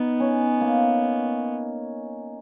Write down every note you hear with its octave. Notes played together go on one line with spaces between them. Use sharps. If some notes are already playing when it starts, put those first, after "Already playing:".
Already playing: B3 D#4
C#4
A#3